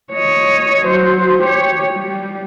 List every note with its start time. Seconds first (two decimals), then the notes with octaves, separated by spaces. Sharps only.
0.13 C#5 D#5
0.86 F#3 C5
1.43 G4 C#5
1.94 G3